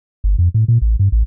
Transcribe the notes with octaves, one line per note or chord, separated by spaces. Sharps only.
G1
F2
A2
A#2
A1
G2
A1